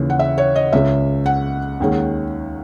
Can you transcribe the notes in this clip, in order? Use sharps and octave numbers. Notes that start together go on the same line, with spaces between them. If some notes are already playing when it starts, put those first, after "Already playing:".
Already playing: D#2 C#3 E3
F#5
E5
C#5
D#5
C#2 C#3 G#3 C#4 E5
F#5
D#2 D#3 G#3 C#4